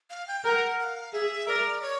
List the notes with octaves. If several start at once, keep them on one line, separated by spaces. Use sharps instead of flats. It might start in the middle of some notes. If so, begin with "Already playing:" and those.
F5
G5
A#4 F#5 G5
F#5
F5
G#4 E5
A#4 D5
C#5